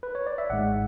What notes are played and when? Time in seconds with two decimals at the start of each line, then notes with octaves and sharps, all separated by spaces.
0.03 B4
0.15 C#5
0.27 D5
0.38 E5
0.50 G#1 G#2 G#3 F#5